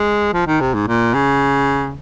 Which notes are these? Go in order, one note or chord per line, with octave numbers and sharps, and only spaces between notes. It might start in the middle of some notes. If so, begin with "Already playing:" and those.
Already playing: G#3
F3
D#3
C3
G#2
A#2
C#3